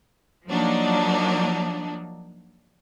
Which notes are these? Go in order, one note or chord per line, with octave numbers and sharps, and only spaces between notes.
F3 F#3 A#3 D4 D#4